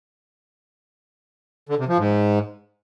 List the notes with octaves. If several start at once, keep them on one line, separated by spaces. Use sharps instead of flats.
D3
C3
F3
G#2